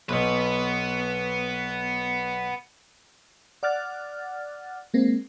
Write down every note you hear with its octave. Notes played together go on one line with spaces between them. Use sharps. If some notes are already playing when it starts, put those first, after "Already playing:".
B1 B2 B3 B4
D5 F#5 D6 F6 F#6 A6
G#3 A#3 C4